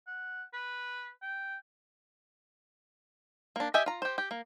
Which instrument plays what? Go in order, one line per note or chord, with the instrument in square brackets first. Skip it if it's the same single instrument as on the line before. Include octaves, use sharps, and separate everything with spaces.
[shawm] F#5
B4
G5
[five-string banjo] A#3 D4
G4 D#5 E5 G#5
F4 A#5
G4 C5
G4
A#3